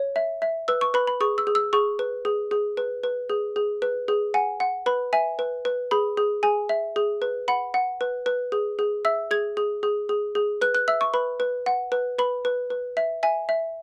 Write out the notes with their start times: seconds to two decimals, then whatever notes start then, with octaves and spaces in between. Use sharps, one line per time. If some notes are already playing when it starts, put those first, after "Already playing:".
Already playing: C#5
0.16 E5
0.42 E5
0.68 B4 E6
0.81 C#6
0.94 B4 B5
1.07 B5
1.21 G#4 C#6
1.38 E6
1.47 G#4
1.55 E6
1.73 G#4 C#6
1.99 B4
2.25 G#4
2.51 G#4
2.77 B4
3.04 B4
3.30 G#4
3.56 G#4
3.82 B4
4.08 G#4
4.34 F#5 G#5
4.60 F#5
4.86 B4 B5
5.13 E5 G#5
5.39 B4
5.65 B4
5.91 G#4 B5
6.17 G#4
6.43 G#4 G#5
6.69 E5
6.96 G#4
7.22 B4
7.48 F#5 B5
7.74 F#5
8.01 B4
8.26 B4
8.52 G#4
8.79 G#4
9.05 E5 E6
9.31 G#4 G#6
9.57 G#4
9.83 G#4
10.09 G#4
10.35 G#4
10.61 B4 F#6
10.75 F#6
10.88 E5 E6
11.01 C#6
11.14 B4 B5
11.40 B4
11.66 F#5
11.92 B4
12.19 B4 B5
12.45 B4
12.70 B4
12.97 E5
13.23 E5 G#5
13.49 E5